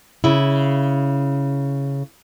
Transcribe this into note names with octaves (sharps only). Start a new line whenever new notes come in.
C#3 E4